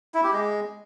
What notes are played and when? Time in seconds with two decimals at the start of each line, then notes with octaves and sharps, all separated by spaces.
0.15 E4
0.24 G4
0.33 G#3